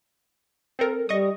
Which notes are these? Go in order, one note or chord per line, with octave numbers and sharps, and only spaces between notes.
C4 A4 A#4
G3 D#5 C#6 D#6